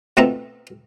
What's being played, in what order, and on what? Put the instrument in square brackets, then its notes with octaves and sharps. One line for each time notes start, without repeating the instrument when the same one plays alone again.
[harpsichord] B2 A3 C4 F4 E5 A#5